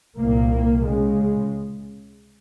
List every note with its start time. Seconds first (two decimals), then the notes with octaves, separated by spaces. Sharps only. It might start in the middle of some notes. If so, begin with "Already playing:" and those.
0.17 C2 A#2 A#3
0.85 C#2 C#3 G#3